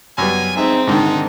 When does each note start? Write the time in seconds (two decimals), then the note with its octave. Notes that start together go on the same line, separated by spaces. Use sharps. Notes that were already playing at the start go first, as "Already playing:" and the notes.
0.18 F#2 G3 B3 G#5
0.57 G#3 C4 D#4 E5
0.87 G#2 D3 D#3 D4 D#4